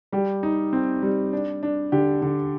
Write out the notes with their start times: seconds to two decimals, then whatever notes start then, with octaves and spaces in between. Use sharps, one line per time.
0.12 G3 G4
0.43 D#4
0.73 C4
1.03 G3
1.33 D4
1.63 D4
1.92 D3 G4
2.22 D3